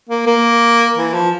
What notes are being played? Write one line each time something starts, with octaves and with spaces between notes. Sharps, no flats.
A#3
A#3
E3
F3